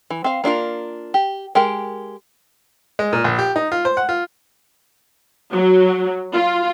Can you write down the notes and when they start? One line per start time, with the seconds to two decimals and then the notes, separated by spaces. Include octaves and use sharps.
0.10 E3
0.24 C4 F5
0.44 A#3 D4 F4 A#4
1.14 G4
1.55 G#3 G4 A#4 G5
2.99 G#3
3.13 A#2
3.24 A#1
3.39 G4
3.56 D#4
3.72 F4
3.85 C5
3.97 F#5
4.09 F4
5.52 F#3
6.33 F4